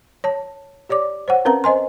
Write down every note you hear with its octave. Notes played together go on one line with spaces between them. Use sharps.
C#5 A5
G4 C#5 D5 D6
C5 C#5 F#5
C4 C#4 A#4 B4 F5 A#5
C5 D#5 G#5 C6